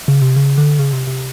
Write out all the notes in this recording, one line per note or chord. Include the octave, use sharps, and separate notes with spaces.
C#3
C3
C#3
D3
C#3
C3
C3